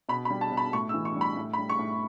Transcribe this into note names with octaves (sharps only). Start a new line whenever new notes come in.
B2 B5
B5
G3
A5
B2
B5
A2 C#6
E6
E3
C#6
G3
B5
A2
B5
G3
C#6
A2